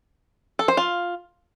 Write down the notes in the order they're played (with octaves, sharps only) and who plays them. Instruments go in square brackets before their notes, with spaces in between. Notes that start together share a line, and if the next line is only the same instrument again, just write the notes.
[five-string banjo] A4
C5
F4